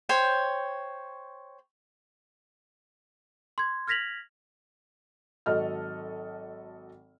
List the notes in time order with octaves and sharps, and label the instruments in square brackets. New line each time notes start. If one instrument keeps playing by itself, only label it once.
[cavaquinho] C5 C#5 G5
[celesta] C6 G#6
F6 G#6 A#6 B6 F7 F#7
[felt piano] G#1 F#3 A4 D#5 F6